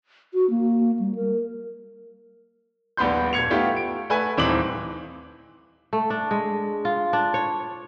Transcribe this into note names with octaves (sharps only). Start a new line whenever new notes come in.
F#4
A#3
G3
A#4
D#1 A#1 B3 B5 C6 G6
D#1 G#6 C#7 F7
A3 B3 F4 G4
D7
A3 B4 F#5 G#5
D#1 E3 C4 D#4 D6 F#7
A3
D4
G#3
F4
D4
C#5